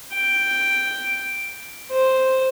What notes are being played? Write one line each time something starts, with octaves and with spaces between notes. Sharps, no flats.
G5
C5